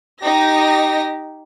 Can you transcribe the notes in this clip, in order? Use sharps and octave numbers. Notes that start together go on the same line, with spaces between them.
D#4 G4 A#6